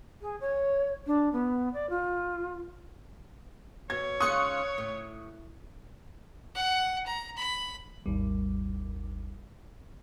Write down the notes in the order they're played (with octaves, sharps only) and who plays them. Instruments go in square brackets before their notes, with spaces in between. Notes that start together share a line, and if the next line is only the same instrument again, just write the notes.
[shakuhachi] G#4
C#5
D4
B3
D5
F4
[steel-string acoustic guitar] B2 [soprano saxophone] C#5 [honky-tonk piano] G#6
[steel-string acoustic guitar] G#2 C#3 F4 [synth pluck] C#6 C#7 [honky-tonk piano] D#6 F#6
[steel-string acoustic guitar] A2
[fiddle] F#5
A#5
B5
[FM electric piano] G#1 D#2 G3